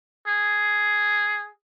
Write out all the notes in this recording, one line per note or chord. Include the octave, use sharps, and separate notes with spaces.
G#4